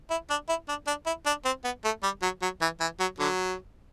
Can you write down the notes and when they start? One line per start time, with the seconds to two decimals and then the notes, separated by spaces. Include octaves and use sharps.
0.11 E4
0.30 D4
0.49 E4
0.69 D4
0.87 D4
1.06 E4
1.26 D4
1.45 C4
1.65 B3
1.85 A3
2.03 G3
2.23 F#3
2.42 F#3
2.62 E3
2.81 E3
3.00 F#3
3.19 D3 F#3